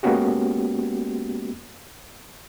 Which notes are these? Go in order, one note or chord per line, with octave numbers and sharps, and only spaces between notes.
G#3 A#3 B3 C#4 F#4 G4